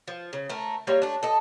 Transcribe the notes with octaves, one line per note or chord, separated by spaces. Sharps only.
F3
C#3
A3 A#4
G3 G#3 A#3 C#5
A3 D4
A4 D#5